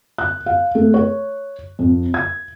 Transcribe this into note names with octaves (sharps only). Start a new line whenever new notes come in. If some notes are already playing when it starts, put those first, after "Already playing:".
F#6
F5
A3
C#5
F2
G#6